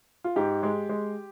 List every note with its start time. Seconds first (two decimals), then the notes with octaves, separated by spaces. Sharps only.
0.24 F4
0.36 G#2 G4
0.63 G#3
0.89 G#3